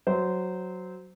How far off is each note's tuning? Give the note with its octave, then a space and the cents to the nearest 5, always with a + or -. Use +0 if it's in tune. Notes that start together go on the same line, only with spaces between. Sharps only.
F#3 +0 C5 -15